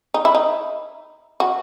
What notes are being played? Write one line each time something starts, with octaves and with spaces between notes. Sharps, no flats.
D#4
E4
D#4
F#4